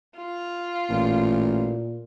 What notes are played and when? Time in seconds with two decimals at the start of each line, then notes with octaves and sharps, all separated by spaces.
0.16 F4
0.90 A1 A#2